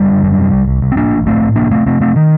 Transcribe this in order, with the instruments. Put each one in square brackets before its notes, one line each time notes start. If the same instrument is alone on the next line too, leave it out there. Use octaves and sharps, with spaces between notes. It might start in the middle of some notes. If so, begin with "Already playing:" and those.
Already playing: [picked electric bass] F#1 G3
D3
F#2
C3
C2
C2
C2
C4
A2 A#3 D4
A1
A2 A3 C4
A2
C3 A#3 D4
C3 A3 C4
C3 A3 C4
C3 A3 C4
D#3